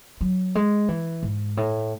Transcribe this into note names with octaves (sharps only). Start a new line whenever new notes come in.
F#3
G#3
E3
G#2
A2